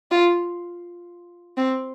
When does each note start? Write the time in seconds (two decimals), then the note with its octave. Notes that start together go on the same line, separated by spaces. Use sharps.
0.11 F4
1.58 C4